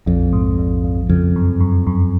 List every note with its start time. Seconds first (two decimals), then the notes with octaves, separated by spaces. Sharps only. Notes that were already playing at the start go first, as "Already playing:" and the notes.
0.06 A#1 F2
0.33 G#2
0.59 A#1
0.84 A#1
1.09 F2 C#3
1.36 F#2
1.60 F#2
1.87 F#2